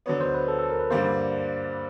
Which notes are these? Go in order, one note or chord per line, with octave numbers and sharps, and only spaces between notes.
D3 F#3 B3 C#5
C5
B4
A4
A4
A#4
B4
G2 D3 G3 A#3 C5